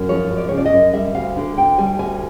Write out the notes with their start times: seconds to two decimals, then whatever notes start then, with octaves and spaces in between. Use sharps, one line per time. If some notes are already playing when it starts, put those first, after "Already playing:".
Already playing: F#2
0.09 F3 C#5
0.30 F#2
0.38 D5
0.49 C#3 C#5
0.58 D5
0.66 D#5
0.73 F#2
0.94 G3 E5
1.15 D2 F5
1.37 D3
1.57 D2 G5
1.79 G3 G#5
1.99 D2 G#5